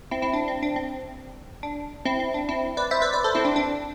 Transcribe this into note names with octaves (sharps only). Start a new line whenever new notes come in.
C4 E4
C4 E4
D4
C4
D4
C4
D4
C4 E4
C4
D4
C4 E4
B4 D5
C5 E5
B4 D5
B4 D5
A4 C5
C4 E4
D4
D4